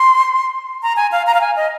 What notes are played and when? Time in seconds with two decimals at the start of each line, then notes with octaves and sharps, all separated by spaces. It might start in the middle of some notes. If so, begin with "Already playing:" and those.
Already playing: C6
0.83 A#5
0.96 G#5
1.12 F5
1.27 A#5
1.34 F5
1.41 G#5
1.56 D#5